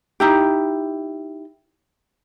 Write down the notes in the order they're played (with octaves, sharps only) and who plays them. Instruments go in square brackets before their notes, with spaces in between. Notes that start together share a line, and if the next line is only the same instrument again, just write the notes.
[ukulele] D#4 E4 G4